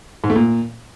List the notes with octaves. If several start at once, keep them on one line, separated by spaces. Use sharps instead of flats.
G#2
A3
A#2